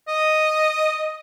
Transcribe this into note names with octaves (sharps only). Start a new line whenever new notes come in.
D#5